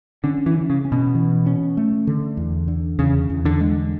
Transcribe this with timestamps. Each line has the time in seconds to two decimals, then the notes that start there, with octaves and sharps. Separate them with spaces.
0.24 D3 C#4
0.46 E3
0.55 C#4
0.70 C#3
0.85 C#4
0.92 B2
1.15 E3
1.46 C#4
1.77 A3
2.07 D3
2.37 E2
2.68 D3
2.99 E2 C#3
3.30 E2
3.45 D3
3.61 G#3